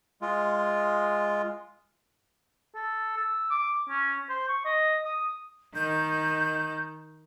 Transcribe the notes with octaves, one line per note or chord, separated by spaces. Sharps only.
G#3 F4
A4
E6
D6
C#4
C5
C#6
D#5
D#6
D#3 G6